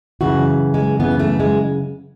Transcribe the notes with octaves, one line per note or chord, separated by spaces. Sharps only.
F#2 C#3 E3 F#4
G#3
F#2 C#3 E3 B3
A3
G#3